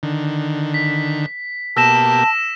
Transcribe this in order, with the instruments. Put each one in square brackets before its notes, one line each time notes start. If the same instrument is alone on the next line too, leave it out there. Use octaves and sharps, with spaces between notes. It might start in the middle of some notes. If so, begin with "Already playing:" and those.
[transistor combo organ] D3 D#3
[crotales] B6
[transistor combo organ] B2 A#3 G4 [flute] A5 [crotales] E6 A#6 E7